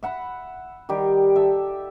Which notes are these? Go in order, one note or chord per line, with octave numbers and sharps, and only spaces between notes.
E5 F#5 B5
D#3 G3 G4
A4 E5